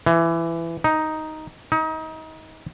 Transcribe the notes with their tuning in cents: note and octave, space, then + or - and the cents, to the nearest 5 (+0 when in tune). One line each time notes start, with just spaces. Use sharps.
E3 +15
D#4 +5
D#4 +30